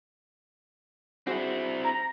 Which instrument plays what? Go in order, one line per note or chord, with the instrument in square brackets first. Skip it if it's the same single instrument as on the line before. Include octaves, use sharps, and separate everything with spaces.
[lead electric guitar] C4 E4 [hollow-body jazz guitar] D4 F#4 G#4
[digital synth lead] A#5